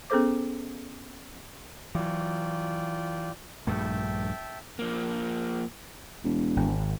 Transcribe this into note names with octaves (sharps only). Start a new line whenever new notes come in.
B3 C#4 G#4 A4 C5 D6
E3 F#3 F4 D5 G5
A#1 G2 A3 E5 G5 A5
F3 A#3
E1
G#1